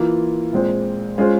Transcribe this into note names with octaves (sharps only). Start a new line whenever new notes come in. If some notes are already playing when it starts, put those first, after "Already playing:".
Already playing: E3 A#3 F4
A#2 G#3 C4
G#3 C#4 F4 G#4 C5